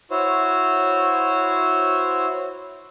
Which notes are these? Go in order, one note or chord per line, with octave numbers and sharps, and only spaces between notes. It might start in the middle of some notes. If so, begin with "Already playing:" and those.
E4 F#4 C5 C#5